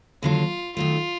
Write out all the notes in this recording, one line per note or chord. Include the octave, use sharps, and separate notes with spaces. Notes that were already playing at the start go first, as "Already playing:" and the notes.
D#2 D3 F#3 F4
D#3 F#3 A3 F4